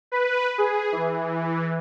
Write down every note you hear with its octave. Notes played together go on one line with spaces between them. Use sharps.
B4
G#4
E3